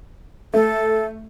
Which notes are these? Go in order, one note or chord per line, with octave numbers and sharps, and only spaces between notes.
A3 A4